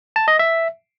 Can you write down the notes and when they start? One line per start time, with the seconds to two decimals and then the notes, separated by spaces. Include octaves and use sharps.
0.16 A5
0.28 D#5
0.39 E5